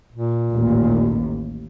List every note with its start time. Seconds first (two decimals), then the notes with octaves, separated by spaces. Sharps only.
0.13 A#2
0.52 A1 D#2